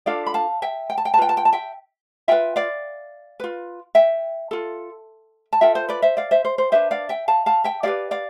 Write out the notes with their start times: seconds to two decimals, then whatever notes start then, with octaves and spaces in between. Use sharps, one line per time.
0.06 D4 F4 A4 D5 F5
0.26 B5
0.34 F5 A5
0.62 E5 G5
0.90 G5
0.98 A5
1.05 G5
1.14 A5
1.17 F4 B4 G5
1.29 A5
1.37 G5
1.45 A5
1.53 E5 G5
2.28 F4 B4 E5 G5
2.56 D5 F5
3.40 F4 B4
3.95 E5 G5
4.51 F4 A4
5.53 A5
5.61 F4 A4 E5 G5
5.75 C5
5.89 B4 D5
6.02 C5 E5
6.17 D5 F5
6.31 C5 E5
6.45 C5
6.58 C5
6.72 D4 G4 B4 C5 E5
6.91 D5 F5
7.09 E5 G5
7.28 F5 A5
7.46 F5 A5
7.64 E5 G5
7.83 E4 G4 B4 D5 F5
8.11 D5 F5